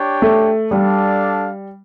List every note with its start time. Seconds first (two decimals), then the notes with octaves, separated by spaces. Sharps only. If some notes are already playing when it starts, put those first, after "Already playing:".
Already playing: D4 G4 C#5 G5
0.22 A3
0.71 G3 D4 A4 D5 F5